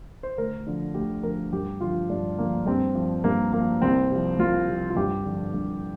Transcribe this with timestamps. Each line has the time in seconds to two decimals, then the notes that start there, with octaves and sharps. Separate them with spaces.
0.23 C5
0.38 D2 A#4
0.67 D3 F3
0.94 D2 G4
1.23 D3 F3 A#4
1.52 G2 G4
1.80 D3 F3 F4
2.10 G2 D4
2.38 D3 F3 A#3
2.67 G2 C4
2.95 F3
3.24 G2 A#3
3.53 F3 A#3
3.82 C2 C4
4.11 C3 F3
4.39 C2 F4
4.68 C3 F3
4.90 F4
4.96 G2 G4
5.25 D3 F3
5.54 G2